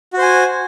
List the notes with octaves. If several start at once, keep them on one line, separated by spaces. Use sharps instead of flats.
F#4 C5 G#5